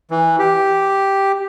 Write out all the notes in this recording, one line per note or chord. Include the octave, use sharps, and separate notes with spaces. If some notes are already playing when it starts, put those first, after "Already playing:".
E3
G4